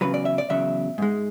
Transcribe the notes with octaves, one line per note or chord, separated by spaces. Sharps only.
E2 C#3 F#3 B4
D5
E5
D5
E2 C#3 F#3 E5
G#2 G#3